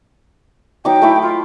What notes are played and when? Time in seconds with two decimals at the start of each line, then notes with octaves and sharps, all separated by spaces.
0.85 F#3 D#4 G5 D6
1.02 A3 E4 D6
1.21 F4